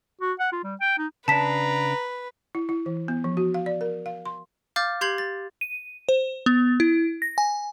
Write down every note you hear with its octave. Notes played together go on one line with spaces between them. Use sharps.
F#4
F#5
F4
G3
G5
D#4
C#3 D4 B4 A5 A#5 B6
E4
E4
E3
B3
F3
F#4
F5
D5
A#4
F5
C6
F5 D6 F6 G6 A6
G4 C6 G6 G#6 C7 F#7
A6
D#7
C5
B3
E4
A#6
G#5